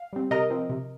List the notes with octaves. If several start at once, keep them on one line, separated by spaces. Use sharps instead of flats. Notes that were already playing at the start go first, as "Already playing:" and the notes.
Already playing: F5
G3 C4
C3 A#4 D#5
F3 C4
C3